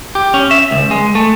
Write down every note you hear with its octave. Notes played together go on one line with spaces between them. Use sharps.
G4
C#4
E5
C#2
G#3
A3